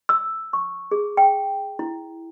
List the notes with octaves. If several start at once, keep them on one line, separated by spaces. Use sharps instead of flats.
E6
C#6
G#4
G5
E4